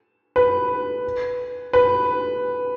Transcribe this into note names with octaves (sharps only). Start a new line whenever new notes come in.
B4
B4